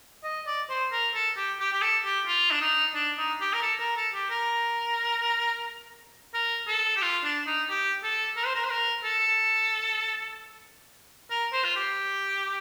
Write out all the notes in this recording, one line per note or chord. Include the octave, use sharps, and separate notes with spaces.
D#5
D5
C5
A#4
A4
G4
G4
G4
A4
G4
F4
D4
D#4
D4
D#4
G4
A#4
A4
A#4
A4
G4
A#4
A#4
A4
G4
F4
D4
D#4
G4
A4
A#4
C5
A#4
C5
A#4
A4
A#4
C5
F4
G4